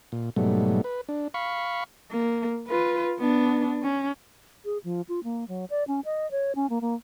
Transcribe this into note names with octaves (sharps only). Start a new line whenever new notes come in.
A#2
G#2 B2 F#3 G3 A3
B4
D4
F5 B5 C#6
A#3
F4 B4
B3 D4
C#4
G#4
F3
F4
A#3
F#3
D5
C#4
D#5
C#5
C#4
A#3
A#3